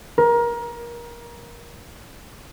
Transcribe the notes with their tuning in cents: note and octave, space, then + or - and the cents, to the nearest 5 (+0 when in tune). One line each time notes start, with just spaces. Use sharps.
A#4 +25